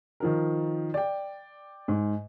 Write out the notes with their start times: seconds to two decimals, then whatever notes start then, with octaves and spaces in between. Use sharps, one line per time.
0.20 D#3 F3 A#4
0.94 D5 G5
1.88 G#2